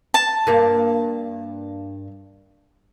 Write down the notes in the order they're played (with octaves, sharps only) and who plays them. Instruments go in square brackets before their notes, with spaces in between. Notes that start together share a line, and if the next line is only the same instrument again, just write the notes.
[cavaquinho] A5
[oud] G2 A#3